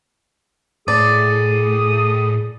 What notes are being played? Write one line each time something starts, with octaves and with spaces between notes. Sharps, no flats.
A2 G#4 D5 D#6